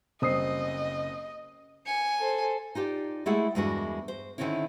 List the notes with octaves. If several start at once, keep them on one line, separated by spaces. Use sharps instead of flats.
F#1 G3 C4 D#5 D#6 C7
G#5 C#7
A4 C5
D#4 F4 G4 D5
G#3 A3 E4 G#4 F#5
E2 G2 G#3 A#3 D4 F#4
C5
D3 D#3 F#3 C4 C#4 E4